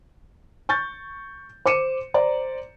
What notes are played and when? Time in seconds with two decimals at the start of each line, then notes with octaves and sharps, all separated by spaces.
0.69 C#6 G6 A6
1.65 C5 D6 C#7 D#7 E7
2.14 C5 D5 A#5